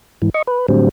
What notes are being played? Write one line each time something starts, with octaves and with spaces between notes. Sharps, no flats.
G#2 E3
D#5 C#6
B4
A2 D3 F#3 G3 C4